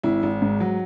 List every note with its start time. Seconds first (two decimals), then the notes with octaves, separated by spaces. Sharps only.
0.03 G#1 E4
0.23 G#1
0.42 G#2
0.60 F#3